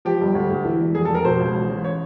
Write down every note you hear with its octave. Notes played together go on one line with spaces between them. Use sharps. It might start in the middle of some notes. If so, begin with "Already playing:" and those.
F3 G4
G1
D2
D2
E3
E1
F1 G#4
A4
F1 A#4
B2 C5
C#2
A1
A1
C#5